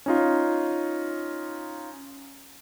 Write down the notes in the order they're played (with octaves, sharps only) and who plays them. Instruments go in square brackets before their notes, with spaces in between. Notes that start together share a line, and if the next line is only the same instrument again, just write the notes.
[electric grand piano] C#4 D#4 F4